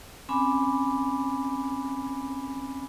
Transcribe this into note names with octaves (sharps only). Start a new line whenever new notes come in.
C4 C#4 G#5 B5 D6